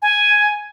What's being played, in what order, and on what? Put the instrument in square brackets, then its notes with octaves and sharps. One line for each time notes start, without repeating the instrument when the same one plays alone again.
[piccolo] G#5